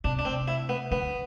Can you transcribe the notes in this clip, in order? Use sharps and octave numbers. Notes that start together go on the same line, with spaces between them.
C3 D4
D4
C4
E4
B3
D3 B3